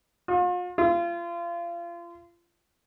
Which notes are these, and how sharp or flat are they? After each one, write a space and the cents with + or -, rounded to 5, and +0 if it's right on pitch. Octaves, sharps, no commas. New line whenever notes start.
F4 +40
F4 -30